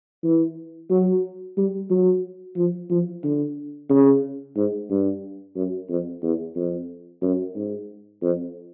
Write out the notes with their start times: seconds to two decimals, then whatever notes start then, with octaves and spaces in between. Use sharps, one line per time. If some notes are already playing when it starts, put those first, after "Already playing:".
0.24 E3
0.90 F#3
1.57 G3
1.90 F#3
2.56 F3
2.90 F3
3.24 D3
3.89 C#3
4.56 G#2
4.90 G2
5.56 F#2
5.89 F2
6.23 E2
6.56 F2
7.22 F#2
7.55 G#2
8.22 F2